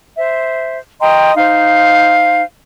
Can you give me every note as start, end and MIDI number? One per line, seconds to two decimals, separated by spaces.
0.17 0.78 72
0.17 0.78 76
1.01 1.34 75
1.01 1.34 79
1.01 1.34 82
1.01 1.34 84
1.37 2.43 63
1.37 2.43 72
1.37 2.43 77